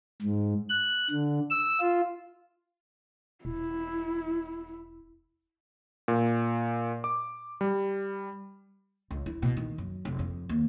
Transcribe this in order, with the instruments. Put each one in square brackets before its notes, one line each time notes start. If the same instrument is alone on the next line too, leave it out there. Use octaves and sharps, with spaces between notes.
[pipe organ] G#2
F#6
D3
E6
F4
[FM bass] E1 [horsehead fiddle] E4
[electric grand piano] A#2
D6
G3
[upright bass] C#2
E4
B2
D#3
F#2
F1
F2
D#2